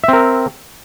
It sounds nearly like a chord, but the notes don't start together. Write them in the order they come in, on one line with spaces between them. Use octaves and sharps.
E5 C4 A#4